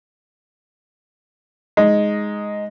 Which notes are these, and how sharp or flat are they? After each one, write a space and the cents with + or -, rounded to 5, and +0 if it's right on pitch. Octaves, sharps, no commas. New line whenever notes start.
G#3 +0 D#4 +0